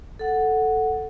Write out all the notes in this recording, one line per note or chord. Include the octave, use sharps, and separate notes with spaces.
A4 F#5